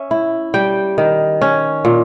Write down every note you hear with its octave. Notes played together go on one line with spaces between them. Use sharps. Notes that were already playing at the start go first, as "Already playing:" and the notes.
Already playing: C#4 E5
E4
G3 G5
D#3
C#4
A#2